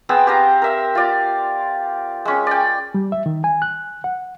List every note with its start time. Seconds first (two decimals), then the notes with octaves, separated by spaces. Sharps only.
0.09 B3 C4 G#4 E6
0.27 G4 C5 F5 A#5
0.62 A#4 E5
0.95 F4 D5
2.25 G#3 C#4
2.47 D5 G5
2.94 G3
3.12 E5
3.26 D#3
3.44 G#5
3.62 F#6
4.04 F#5